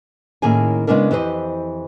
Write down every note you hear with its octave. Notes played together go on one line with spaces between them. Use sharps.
A2 D#3 A#3 C#4 G#4 G#5
C#3 G#3 B3 C#4 D4 A#4
F2 E3 G4 B4 C5 D#5